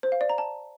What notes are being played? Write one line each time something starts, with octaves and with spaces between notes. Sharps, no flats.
C5
F5
D5
A#5
A5